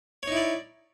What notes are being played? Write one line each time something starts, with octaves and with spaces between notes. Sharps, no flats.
D#4 E4 C#5 D5